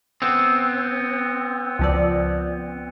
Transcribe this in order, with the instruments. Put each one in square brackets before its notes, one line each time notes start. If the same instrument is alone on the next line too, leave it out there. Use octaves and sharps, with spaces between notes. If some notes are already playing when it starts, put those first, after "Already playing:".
[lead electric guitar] B3 C4
[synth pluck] C#2 F3 D5